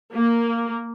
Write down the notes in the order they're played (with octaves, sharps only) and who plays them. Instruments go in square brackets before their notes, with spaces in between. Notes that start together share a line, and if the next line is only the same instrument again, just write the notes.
[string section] A#3